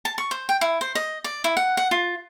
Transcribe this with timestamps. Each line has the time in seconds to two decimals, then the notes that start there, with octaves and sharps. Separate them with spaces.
0.05 A5
0.18 C#6
0.31 C5
0.49 G5
0.61 E4
0.81 C5
0.95 D#5
1.24 D5
1.44 E4
1.57 F#5
1.77 F#5
1.91 F4